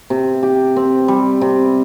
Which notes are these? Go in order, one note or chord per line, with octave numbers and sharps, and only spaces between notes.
C3
G4
C4
G3
C3